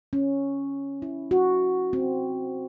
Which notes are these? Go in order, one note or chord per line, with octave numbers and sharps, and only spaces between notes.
C#4
E4
F#4
C4